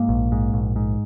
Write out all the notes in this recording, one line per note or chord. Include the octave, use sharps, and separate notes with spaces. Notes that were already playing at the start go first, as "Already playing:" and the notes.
Already playing: G#2 A#3
A#1
G#2
A#1
G#2